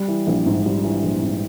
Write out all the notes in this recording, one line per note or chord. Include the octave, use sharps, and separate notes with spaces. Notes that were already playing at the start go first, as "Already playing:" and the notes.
Already playing: G3
E3
A#1
G#2
G3
E3
A#1
G#2